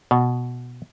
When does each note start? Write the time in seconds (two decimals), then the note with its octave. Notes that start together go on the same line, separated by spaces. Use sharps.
0.11 B2